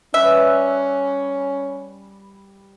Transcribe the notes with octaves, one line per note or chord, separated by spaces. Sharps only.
G3 C#4 B4 E5